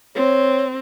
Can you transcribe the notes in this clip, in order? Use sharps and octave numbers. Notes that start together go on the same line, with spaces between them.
C4 C#5